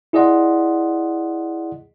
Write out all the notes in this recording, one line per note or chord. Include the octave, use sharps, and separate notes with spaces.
E4 G#4 D5 D#5 F#5 C6